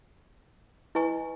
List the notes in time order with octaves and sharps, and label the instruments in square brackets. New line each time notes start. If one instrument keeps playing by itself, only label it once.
[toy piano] E4 B4 D#5 G#5 C#6